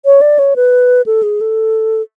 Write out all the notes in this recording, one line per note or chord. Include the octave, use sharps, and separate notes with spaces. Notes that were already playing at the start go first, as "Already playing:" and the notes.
C#5
D5
C#5
B4
A4
G#4
A4